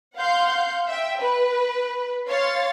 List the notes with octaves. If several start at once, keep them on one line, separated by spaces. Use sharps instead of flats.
F5 F#5 C6 G6
E5 G5
B4
C#5 F5 C6 A6